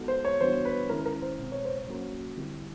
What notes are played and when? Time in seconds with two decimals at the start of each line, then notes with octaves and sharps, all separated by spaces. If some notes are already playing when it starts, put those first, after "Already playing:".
Already playing: G#3 B3 D#4 F#4 A4
0.08 C5
0.25 C#5
0.41 E3 G3 B3 D4 F#4 C5
0.65 B4
0.89 D#3 G#3 C#4 E4 A#4
1.06 A#4
1.22 C5
1.39 B2 G#3 C4
1.52 C#5
1.65 C5
1.78 C#5
1.87 F#3 A#3 C#4 F#4 A#4
2.36 D3 G3 C4 E4 G4